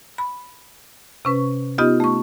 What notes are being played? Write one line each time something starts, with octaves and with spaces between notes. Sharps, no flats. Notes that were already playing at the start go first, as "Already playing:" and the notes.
B5
C3 C#4 B4 C#6
B3 D#4 F4 G4 D#5
A3 C#6